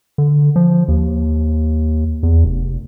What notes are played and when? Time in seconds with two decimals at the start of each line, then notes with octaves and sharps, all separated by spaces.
0.18 D3
0.56 F3
0.88 D#2
2.23 E2
2.44 F1